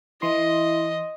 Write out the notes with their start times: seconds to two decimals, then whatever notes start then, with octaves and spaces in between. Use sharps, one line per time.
0.22 E3 E4 D#5 C6